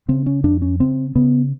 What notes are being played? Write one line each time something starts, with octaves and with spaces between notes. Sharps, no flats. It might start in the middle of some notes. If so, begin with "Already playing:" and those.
C#3 C4
C#4
F2 D4
C#4
C#3 C4
C#3 B3